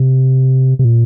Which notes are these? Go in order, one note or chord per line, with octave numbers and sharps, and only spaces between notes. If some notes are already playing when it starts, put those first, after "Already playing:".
Already playing: C3
C3
A#2